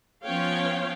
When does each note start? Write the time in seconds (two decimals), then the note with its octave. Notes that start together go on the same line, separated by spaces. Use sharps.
0.24 F3 B3 C#4 C#5 F5 G5